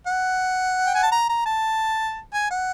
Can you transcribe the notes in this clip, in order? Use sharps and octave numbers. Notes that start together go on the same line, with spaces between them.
F#5
G5
G#5
A5
A#5
A#5
A5
G#5
F#5